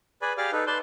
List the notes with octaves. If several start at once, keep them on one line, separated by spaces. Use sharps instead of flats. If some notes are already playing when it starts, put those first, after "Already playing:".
G#4 B4 D5 G#5 B5
G4 G#4 D5 F5 D6 F6
D#4 A4 B4
B4 D5 A5 C6 G6